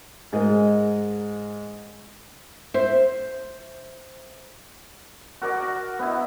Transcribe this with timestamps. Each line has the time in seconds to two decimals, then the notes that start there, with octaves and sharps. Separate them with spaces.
0.33 G#2 G#3 A#4 D#5
2.74 C5 E5
5.42 F#4 A#4 D5
5.99 B3 D#4 E4